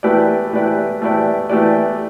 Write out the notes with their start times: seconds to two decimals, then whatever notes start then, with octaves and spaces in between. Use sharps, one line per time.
0.03 E3 A3 G4 B4 D5
0.53 E3 A3 G4 B4 D5
1.02 E3 A3 G4 B4 D5
1.50 E3 A3 G4 B4 D5